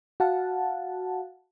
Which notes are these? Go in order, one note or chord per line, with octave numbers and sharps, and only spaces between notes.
F#4 F5 F#5 A5